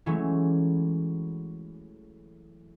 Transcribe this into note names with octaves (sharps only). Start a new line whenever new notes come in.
E3 F#3 G#3 A3 C#4